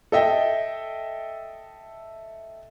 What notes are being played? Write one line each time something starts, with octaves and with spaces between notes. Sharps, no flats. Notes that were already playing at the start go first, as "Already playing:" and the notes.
A4 D#5 E5 G5